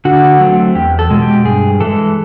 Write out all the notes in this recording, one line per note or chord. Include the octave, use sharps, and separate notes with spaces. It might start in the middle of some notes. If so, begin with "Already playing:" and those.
D3 F#4
F#3 A3 C4
E2 G4
A4
B2 G#3
G4
G2 G#4
E3 G#3 A4